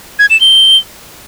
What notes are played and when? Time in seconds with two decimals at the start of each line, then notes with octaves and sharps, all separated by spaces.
0.19 G#6
0.30 E7
0.41 G7